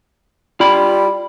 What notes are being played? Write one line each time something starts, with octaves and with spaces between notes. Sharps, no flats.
G3 F4 B5